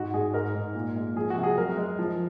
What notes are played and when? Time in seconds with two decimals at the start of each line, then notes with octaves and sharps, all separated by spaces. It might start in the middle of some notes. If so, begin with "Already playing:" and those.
Already playing: G#2 F#4
0.14 G#2 G#4
0.33 G#2 A#4
0.55 G#2
0.75 A#2
0.96 G#3
1.16 F3 G#4
1.30 F#4
1.36 C3
1.43 G#4
1.57 F#2 A#4
1.77 G#3
1.99 F3